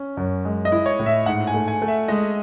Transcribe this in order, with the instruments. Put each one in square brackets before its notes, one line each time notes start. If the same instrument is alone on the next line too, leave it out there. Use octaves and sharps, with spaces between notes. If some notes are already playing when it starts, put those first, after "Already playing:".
Already playing: [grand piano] C#4
F#2
G#3
[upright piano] D#5
[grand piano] E4
[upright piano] C#5
[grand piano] A2
[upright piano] E5
[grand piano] G#2 [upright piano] F#5
[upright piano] G#5
[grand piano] A3
[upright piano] G#5
[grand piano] A3
[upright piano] E5
[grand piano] G#3 [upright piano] D#5